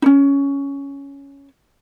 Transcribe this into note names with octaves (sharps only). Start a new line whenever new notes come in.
C#4 D#4